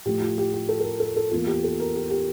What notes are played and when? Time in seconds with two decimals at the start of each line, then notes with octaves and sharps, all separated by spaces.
0.06 A2 F3 A3 G4
0.21 F4
0.38 G4
0.53 G4
0.69 A4
0.80 A4
0.84 A#4
1.00 A4
1.16 A4
1.31 E2 E3 A#3 F4
1.47 G4
1.64 A4
1.80 A#4
1.95 G4
2.10 G4